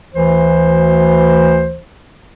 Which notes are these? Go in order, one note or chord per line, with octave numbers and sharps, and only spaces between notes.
D2 E3 C5